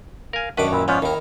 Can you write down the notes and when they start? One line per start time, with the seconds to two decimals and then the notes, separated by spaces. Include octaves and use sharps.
0.33 A#4 F5 G#5
0.58 F#2 D#3 D4 B4 F#5 C#6 D6
0.73 A#2 E4 B4 E5
0.88 G#2 F3 B3 C#4 C#5 D5 F5
1.02 D#2 D#3 E4 A#4